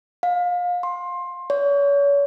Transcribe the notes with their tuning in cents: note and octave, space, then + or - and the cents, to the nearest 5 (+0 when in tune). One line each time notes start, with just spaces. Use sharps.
F5 +30
C6 +20
C#5 +35